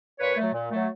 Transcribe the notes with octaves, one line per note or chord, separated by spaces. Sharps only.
A#2 B4 C#5
F#3 A3
A#2
F#3 A3